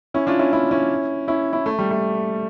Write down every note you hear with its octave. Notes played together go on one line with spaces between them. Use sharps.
C#4 E4
D4 F4
C#4 E4
C#4 E4
C#4 E4
C#4 E4
C#4 E4
A3
G3
A3